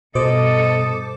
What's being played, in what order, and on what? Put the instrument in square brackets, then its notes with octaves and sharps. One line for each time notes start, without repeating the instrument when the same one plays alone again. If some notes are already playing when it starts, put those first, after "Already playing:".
[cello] G2 A4 [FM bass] B2 [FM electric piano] C5 D6 [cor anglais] D#5